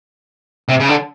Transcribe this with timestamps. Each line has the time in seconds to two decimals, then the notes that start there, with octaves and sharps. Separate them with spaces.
0.69 C3
0.80 C#3
0.89 D3